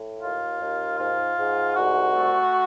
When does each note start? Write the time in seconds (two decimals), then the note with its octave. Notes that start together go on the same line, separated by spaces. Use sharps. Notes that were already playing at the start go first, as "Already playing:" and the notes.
Already playing: A2
0.22 D#2 F4
0.60 D#2
0.99 G#2 F4
1.38 G#2
1.76 C2 F#4
2.15 A3